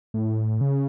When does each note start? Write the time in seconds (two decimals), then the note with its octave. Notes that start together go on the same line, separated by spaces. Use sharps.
0.14 A2
0.61 C#3